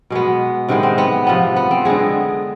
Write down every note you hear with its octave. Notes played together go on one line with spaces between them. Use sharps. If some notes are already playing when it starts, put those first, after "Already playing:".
B2 G#3 B3
C3 D#3 G#3 B3
C4
B3
C3 F3 B3
B3
C4
D3 G#3 B3 G#4